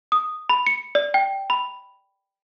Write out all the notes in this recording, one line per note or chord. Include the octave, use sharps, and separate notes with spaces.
D#6
B5
C#7
D5
G5
B5